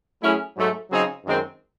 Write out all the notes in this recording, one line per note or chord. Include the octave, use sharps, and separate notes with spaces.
F#3 A3 C#4 E4 G#4
G#2 F#3 A3
C#3 F#3 C4 D#4 G#4
F#2 D#3 G#3 C4